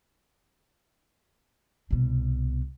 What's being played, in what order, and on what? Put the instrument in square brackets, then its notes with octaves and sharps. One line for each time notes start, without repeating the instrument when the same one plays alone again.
[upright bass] C2 B2